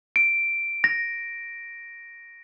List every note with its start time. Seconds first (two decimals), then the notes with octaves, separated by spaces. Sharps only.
0.16 D7
0.84 A#6